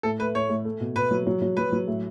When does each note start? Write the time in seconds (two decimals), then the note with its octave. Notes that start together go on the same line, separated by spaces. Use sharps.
0.03 A2 A4
0.19 A3 B4
0.35 A2 C#5
0.49 A2
0.65 A3
0.80 B2
0.96 B2 B4
1.11 F#3
1.27 F#3
1.42 F#3
1.57 F#3 B4
1.72 F#3
1.88 A2